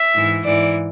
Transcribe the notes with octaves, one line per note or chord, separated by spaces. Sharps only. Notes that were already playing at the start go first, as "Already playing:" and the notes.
Already playing: E5
G#2 E3
G#2 E3 D5